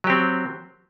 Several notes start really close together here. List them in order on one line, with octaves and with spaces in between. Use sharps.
F#3 G4 C4